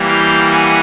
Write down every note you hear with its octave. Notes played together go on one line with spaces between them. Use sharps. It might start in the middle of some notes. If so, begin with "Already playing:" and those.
Already playing: E3 G3 A#3
F5 G5
F#5 G#5